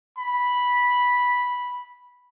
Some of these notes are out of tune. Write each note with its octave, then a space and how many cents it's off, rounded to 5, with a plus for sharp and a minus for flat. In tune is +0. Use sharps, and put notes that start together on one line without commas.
B5 -5